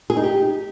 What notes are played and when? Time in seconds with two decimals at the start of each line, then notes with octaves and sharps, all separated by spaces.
0.10 G#4
0.17 D#4
0.24 G4